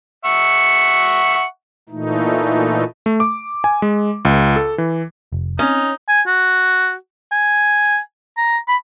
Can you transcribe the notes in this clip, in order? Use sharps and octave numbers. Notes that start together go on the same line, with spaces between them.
E5 F#5 C#6
A#2 E3 A3 D#4
A3
D6
G#5
G#3
C#2
A4
E3
F1
C4 C#4 D#4
G#5
F#4
G#5
A#5
B5